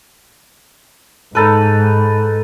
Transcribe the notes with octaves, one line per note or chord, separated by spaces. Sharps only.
G#2 D#4 A4 B4